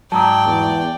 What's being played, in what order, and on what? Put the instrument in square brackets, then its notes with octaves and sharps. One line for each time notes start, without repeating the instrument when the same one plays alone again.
[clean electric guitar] G#2 F#3 [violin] D5 G5 [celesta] A5 A#5 D#6
[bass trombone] E2